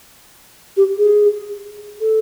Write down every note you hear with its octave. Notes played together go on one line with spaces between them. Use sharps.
G4
G#4
A4